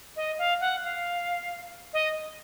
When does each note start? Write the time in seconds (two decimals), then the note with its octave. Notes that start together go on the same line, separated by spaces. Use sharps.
0.16 D#5
0.38 F5
0.61 F#5
0.83 F5
1.93 D#5